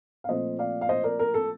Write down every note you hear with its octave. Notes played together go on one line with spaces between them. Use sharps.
F5
A#2 F3 A3 C4 C5 D#5
D5 F5
F5
C5 D#5
A#4 D5
A#4
A4